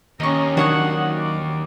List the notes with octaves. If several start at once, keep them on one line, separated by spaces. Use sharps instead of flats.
D#2 C#4 D#5 A#5 C#6
D#3 F#3 D4 F#4 C#5 F#5 D#6
D6